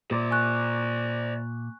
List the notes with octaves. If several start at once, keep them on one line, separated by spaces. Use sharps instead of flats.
A#2 C5 D5
G#5 C#6 F#6